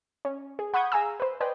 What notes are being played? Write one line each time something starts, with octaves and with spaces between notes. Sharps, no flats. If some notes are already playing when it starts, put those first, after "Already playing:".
C#4
G#4
F#5 B5 C#6 D#6 G6 G#6
G#4 F5 G#5 A#5 E6
B4 C5
B4 C5 D5 D#5 G5 G#5